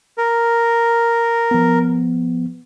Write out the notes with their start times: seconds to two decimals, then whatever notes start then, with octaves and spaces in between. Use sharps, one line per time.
0.18 A#4
1.51 F3 B3